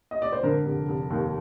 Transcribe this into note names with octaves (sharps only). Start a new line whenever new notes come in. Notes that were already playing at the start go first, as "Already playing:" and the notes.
D#5
D5
C5
D3 A#4
F1
F1
D#2